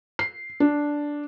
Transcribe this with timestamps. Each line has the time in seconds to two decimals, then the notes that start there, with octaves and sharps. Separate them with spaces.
0.19 C7
0.60 D4